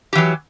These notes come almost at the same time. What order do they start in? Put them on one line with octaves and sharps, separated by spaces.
G4 E3 F#3